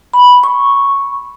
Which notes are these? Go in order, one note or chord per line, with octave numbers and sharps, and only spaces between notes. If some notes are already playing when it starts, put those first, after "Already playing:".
B5
C#6